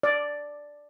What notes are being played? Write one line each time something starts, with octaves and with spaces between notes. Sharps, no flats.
D5